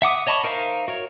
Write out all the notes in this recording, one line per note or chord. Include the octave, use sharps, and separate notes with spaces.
E5 F#5 D6 D#6
C#5 D#5 A5 B5 C#6
D#4 A#4 C5 E5 F5
F#4 A#4 C#5